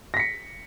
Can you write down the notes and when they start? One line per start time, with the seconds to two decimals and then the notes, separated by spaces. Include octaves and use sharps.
0.14 A#6
0.17 B6
0.20 C#7